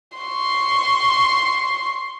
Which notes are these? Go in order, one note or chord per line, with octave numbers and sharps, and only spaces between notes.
C6 C#6